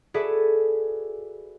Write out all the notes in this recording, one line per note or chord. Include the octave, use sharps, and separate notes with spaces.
F#4 G#4 A4 B4 D5 E5